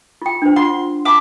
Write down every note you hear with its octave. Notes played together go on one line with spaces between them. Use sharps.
F4 G5
D4 C5
F4 F#5 C6
A5 B5 D6